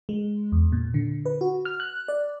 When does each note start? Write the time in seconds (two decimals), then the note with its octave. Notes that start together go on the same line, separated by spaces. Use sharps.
0.09 G#3
0.52 E2
0.72 A#2
0.94 D3
1.26 B4
1.41 F#4
1.65 F6
1.80 F#6
2.08 D5